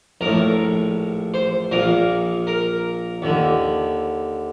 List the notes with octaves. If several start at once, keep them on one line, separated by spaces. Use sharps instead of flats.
A#1 A2 A#4
C5
A#1 A#2 A#4
A#4
D#2 D3